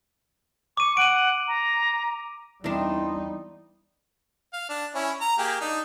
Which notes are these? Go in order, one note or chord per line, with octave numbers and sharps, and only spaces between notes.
C#6 D6 D#7
F#5 D7 D#7
A#5
E2 E3 G3 C4 D4 D#4
F5
D4
C#4 E4
A#5
A#3 G4 G#4
D4 D#4